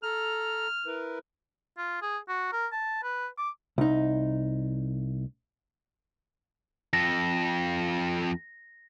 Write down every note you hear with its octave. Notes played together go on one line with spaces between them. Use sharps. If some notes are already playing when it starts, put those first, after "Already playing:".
A4 A#5 F6
E4 A#4 B4
F4
G#4
F#4
A#4
A5
B4
D6
C2 D#4
F2 A4 A#6